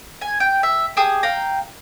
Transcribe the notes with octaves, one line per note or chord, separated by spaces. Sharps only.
G#5
G5
E5
G4 G#4 A5 D#6
F5 G5 A#5